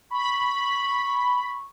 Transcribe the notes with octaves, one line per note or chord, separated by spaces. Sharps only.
B5 C#6